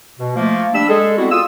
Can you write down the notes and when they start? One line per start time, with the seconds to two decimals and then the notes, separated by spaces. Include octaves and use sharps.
0.19 B2
0.36 F3 A3 A#3
0.74 G3 D4 B5 E6
0.89 G#3 G#4 A4
1.18 G3 B3 C4 E4 F#4
1.31 F4 D#6 E6